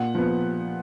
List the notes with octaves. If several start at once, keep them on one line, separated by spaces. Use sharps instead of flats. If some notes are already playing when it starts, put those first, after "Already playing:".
Already playing: A#2 F#5
F3 B3